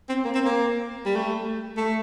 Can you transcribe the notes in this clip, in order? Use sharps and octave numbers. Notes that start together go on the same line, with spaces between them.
C4
A#3
C4
A#3
G3
A3
A3